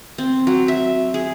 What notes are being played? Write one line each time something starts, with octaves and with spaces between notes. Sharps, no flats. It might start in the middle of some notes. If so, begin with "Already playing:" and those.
C4
F#3
E5
G#4